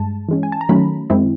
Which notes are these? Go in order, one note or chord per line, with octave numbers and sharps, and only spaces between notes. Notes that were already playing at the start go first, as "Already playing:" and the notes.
Already playing: G2 G#3 A5
E3 G#3 C#4
G#5
A5
A#5
D#3 F#3 A3 C#4 B5
F#2 D#3 G#3 C4 E4